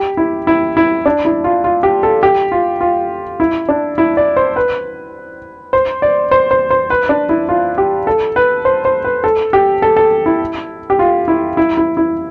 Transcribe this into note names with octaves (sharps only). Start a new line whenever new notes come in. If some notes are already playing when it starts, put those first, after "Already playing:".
Already playing: G4
E4
E4
E4
D4
E4
F4
F4
G4
A4
G4
F4
F4
E4
D4
E4
D5
C5
B4
C5
D5
C5
C5
C5
B4
D4
E4
F4
G4
A4
B4
C5
C5
B4
A4
G4
A4
A4
E4
G4
F4
E4
E4
E4
E4